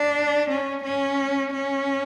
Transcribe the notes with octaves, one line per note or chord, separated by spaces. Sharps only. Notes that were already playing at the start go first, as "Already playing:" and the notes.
Already playing: D4
C#4
C#4
C#4